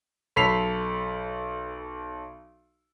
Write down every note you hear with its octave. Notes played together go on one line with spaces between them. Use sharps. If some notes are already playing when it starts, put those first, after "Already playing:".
B1 A4 B5 B6 C7 F7